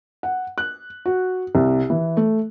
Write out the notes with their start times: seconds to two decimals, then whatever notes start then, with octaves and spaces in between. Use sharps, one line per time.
0.23 F#5
0.58 F#6
1.06 F#4
1.55 C2
1.90 E3
2.17 A3